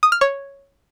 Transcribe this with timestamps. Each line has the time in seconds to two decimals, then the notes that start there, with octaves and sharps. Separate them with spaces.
0.03 D#6
0.12 F6
0.21 C#5